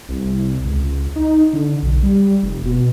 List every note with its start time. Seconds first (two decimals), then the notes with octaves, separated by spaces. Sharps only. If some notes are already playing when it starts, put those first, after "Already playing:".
0.09 C2
0.65 C#2
1.16 D#4
1.53 D3
1.83 B1
2.03 G3
2.43 F1
2.65 B2